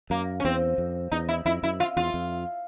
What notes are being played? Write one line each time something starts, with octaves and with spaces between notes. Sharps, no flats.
F#2 A#3
C#4
E2 C4
F2
E2 D#4
E4
F2 E4
F#2 E4
F4
E2 F4
F2